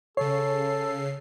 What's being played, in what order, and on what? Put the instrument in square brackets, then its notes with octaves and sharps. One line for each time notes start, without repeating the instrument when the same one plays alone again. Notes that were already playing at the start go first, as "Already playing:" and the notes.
[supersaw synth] C#3 C7 [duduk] A4 [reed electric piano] C#5